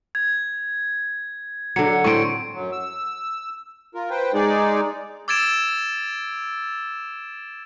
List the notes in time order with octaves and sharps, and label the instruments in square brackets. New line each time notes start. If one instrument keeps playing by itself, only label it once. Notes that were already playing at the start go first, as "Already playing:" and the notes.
[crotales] G#6
[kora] D3 F#3 [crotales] C#7
[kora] A2 C4 [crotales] C#6 D7
[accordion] F#2 F#3
E6
F4 A#4
B4 C5 G5
G#3 D#4 G#4 D5
[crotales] D6 E6 G#6 A6 D7 E7